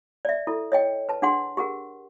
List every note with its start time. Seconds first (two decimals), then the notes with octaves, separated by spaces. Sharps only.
0.25 D5 E5
0.47 E4 A4
0.72 C#5 D#5 G5
1.09 B4 A5
1.22 D4 G#4 F#5 C6
1.57 G4 G#4 A#4 F#5